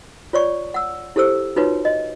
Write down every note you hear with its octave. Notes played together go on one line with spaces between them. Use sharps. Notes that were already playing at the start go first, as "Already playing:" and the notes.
F4 C#5 D5 C#6
F#5 E6
E4 G4 A4 C5 E6
D#4 F4 F#4 B4 C#5
D#5